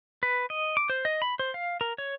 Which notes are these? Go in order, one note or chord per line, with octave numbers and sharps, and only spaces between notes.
B4
D#5
D6
C5
D#5
B5
C5
F5
A#4
C#5